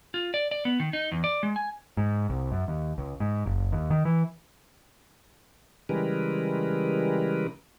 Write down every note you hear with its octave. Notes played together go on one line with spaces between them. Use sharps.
F4
D5
D5
B3
D#3
D#4
E2
D5
G#3
G#5
G#2
C2
F#2
D#2
C#2
G#2
F#1
D#2
D#3
E3
C#3 E3 G3 G#3 A#4 B4